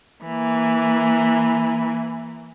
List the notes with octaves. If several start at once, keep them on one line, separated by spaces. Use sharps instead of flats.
E3 A#3